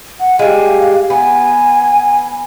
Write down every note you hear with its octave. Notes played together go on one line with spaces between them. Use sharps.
F#5
G3 G#3 F5
B3 G#5